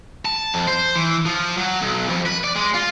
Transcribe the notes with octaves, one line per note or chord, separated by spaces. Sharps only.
A5
F2
C5
E3
F3
F#3
B1
F2
B4
D5
G#3
F4